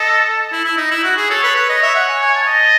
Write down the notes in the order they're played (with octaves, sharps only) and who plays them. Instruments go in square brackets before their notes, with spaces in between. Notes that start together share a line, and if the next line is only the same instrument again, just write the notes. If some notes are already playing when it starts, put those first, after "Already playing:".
Already playing: [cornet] A4 [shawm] D#5
[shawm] E4
E4
D#4
E4
F#4
G#4
[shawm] A4 [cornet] C#5
[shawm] B4
B4
[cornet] C#5 [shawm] D#5
[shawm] E5
F#5
G#5
G#5
A5
[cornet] D#5